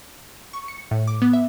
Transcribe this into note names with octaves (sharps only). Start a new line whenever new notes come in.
C#6
C#7
A2
D6
B3
E5